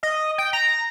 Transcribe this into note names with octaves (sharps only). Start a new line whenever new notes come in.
D#5
G5
A#5